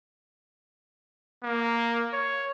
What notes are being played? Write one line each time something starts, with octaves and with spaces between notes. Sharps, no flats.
A#3
C#5